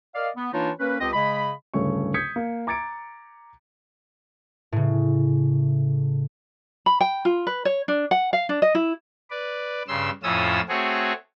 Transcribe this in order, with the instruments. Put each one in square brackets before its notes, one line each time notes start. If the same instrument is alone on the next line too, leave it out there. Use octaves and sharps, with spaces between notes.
[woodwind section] A#4 D5 D#5 F5
B3
E3 A#3 D4 D#4 F4 C#5
A#3 C#4 A#4 B4
C#2 C4 G4 D#5
C#3 G#3 D#5 B5
[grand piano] D1 G2 C#3 A3 C#5 C#6
D#6 G6 G#6 B6 C#7
A#3
A#5 D6 G#6 A6 C#7 D7
[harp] A2 C#3
[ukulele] B5
G5
F4
B4
C#5
D4
F#5
F5
D4
D#5
E4
[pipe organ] B4 D5
G2 C#3 C6 E6
F2 A2 C#4 F4 D#6 E6
A3 C4 F#4 G#4 C#5